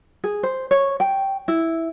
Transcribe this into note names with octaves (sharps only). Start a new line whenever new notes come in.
G#4
C5
C#5
G5
E4